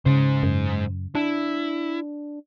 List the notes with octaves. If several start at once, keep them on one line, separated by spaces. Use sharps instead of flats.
G#2 C#3 C5
F#2
D4 E4